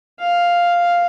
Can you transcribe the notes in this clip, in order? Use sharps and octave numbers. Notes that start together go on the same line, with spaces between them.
F5